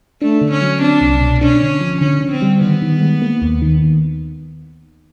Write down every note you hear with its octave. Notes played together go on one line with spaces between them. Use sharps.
A3 D4
D3
C#4
F#3
C4 D4
C2
B2
C#4 D4
D3
F3
D3 C#4
D3
C4
G3
D#3 B3
D#3
G#3
A#3
D#2
D#3